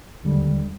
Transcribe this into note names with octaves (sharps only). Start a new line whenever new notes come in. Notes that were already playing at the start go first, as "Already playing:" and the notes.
D#2 D3 G3